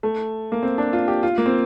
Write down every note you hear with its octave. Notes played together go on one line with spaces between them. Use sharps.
A3
A#3
C4
D4
F4
G4
F4
A#3
C4